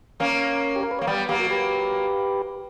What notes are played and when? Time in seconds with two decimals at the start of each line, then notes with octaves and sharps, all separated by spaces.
0.20 A#3 C#4 A#4 C#5
0.76 G4
0.83 A#4
0.91 B4
0.99 A#3 C#5
1.07 G3 B3 B4 D5
1.29 F#3 A#3 G4 B4
1.39 F#4 A#4
1.51 G4 B4